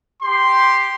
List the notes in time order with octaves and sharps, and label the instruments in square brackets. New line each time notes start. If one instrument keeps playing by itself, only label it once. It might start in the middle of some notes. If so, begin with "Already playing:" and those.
[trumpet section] G4 C6